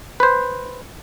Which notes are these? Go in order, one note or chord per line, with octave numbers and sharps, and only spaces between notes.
B4 C5